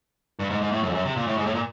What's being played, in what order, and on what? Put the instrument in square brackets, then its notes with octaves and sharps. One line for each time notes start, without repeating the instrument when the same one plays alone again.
[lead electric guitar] G2
G#2
G#2
A2
F#2
F2
F#2
C3
A#2
A2
G#2
A2
A#2